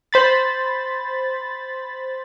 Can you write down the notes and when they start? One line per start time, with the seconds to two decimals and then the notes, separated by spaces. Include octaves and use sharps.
0.13 C5 B5 A6